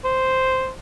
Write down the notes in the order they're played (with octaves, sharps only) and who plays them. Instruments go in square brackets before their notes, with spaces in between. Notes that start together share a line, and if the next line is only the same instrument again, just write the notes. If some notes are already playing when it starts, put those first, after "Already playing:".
[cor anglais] C5